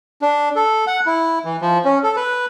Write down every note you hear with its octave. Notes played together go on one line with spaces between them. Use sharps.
D4
A4
F#5
E4
E3
F3
C#4
A4
B4